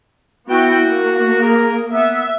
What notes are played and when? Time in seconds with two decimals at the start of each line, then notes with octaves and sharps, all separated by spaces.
0.49 B3 E4 F#4 G5
0.85 A#3
1.42 G#4 A#4
1.92 B3 E5